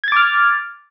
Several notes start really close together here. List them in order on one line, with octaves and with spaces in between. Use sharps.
G#6 A6 D6 F6